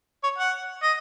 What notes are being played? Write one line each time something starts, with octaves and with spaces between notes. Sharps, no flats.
C#5
F#5
D#5